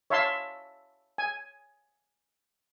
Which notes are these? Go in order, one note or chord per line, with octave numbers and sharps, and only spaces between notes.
C#5 E5 F5 A5 C6
G#5